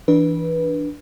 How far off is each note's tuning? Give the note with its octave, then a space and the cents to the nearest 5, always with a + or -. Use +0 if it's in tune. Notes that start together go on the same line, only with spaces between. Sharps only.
E3 +0 D4 +0 B4 -20